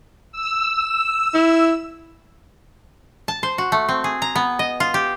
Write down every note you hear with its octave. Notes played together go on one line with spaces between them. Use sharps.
E6
E4
A5
C5
F#4
A3
C4
G#4
A#5
B3
D#5
F4
G4